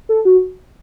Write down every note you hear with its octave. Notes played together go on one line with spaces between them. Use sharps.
A4
F#4